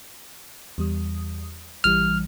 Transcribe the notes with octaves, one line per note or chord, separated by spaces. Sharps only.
E2 G3 D#6
A#1 E3 G3 F6